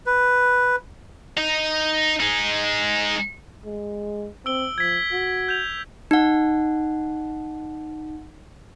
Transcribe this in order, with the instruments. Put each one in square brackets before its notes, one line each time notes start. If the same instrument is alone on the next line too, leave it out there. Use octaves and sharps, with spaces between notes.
[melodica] B4
[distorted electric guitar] D#4
G#3 D#4
[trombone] G#3
[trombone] C4 [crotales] E6 D7 G7
[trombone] F3 [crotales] G#6 B6
[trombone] F#4
[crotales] G6 F7
[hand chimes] D#4 F#5